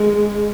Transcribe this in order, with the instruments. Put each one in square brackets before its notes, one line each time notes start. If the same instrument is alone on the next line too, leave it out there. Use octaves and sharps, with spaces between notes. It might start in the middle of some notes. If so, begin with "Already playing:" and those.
Already playing: [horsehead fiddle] G#3